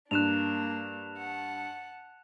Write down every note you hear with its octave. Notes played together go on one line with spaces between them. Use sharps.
G2 A#3 D4 F#6 E7 F7
F#5 A5